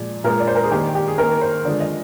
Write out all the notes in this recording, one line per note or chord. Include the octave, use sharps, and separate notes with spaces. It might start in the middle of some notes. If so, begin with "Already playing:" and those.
Already playing: A#2 F3 G#3 D5
A#2 G#3 A#4
D5
C5
A#4
G#4
D#3 A#3 G4
G4
G#4
D#3 A#3 A#4
C5
D3 F3 G#3 D5
D#5